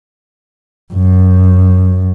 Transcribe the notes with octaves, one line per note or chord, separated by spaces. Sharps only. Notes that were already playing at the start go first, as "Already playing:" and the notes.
F#2